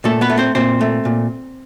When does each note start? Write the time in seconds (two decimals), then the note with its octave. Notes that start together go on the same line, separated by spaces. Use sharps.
0.04 A#2 A3 A4
0.21 B3 B4
0.30 A3
0.38 C4 C5
0.55 A#2 C4 C5
0.81 A3
1.05 A#2